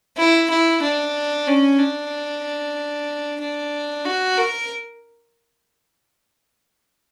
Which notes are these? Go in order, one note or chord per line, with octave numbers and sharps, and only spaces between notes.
E4
E4
D4
C#4
D4
D4
F#4
A#4